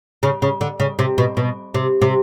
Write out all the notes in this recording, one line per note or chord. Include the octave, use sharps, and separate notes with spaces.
C#3
C#3
D3
C#3
C3
B2
B2
C3
C3